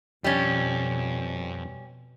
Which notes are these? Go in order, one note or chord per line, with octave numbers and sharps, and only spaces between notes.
F2 B2 G3 C#4